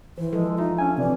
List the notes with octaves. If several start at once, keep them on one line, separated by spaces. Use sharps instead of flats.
E3 C5
F3 G#3 A4
D#4 F4 E5
C#4 D4 G#5
C3 E3 D5